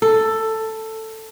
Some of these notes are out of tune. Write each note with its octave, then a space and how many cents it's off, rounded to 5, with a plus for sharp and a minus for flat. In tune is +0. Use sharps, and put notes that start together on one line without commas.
A4 +10